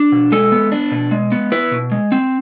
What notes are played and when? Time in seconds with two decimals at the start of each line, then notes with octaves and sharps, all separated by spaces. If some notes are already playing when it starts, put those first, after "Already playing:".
Already playing: D4
0.12 B2
0.32 G#3 A4
0.52 B3
0.72 D4
0.92 B2
1.11 G#3
1.32 B3
1.52 E4 B4
1.72 B2
1.92 G#3
2.12 C4